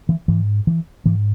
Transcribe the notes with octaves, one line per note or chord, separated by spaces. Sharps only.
E3
G#2 E3
E3
G#2 E3